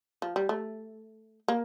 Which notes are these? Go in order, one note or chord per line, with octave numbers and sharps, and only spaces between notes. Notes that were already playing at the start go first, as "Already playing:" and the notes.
F3
G3
A3
A#3